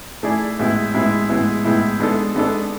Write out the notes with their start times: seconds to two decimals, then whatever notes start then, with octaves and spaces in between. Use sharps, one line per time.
0.23 A3 E4 G#4 D5
0.59 A2 G#3 B3 E4
0.94 A2 G#3 B3 E4
1.29 A2 G#3 B3 E4
1.64 A2 G#3 B3 E4
2.00 G#3 B3 D4 A4
2.35 G#3 B3 D4 A4